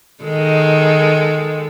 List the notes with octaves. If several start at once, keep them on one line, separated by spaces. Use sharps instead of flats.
D#3 G#3 A4